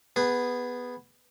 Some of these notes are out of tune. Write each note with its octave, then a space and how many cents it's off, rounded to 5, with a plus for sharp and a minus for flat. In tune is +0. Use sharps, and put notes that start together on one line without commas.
B3 +0 G#4 -20